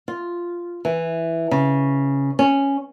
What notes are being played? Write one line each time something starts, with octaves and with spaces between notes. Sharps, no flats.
F4
E3
C#3
C#4